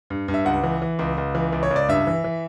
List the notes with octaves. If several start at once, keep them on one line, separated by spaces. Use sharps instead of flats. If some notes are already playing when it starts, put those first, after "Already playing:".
G2
G2
E5
C#2 F#5
E3
E3
C#2
C#2
E3
C#2
C#5
C#2
D5
G2 E5
E3
E3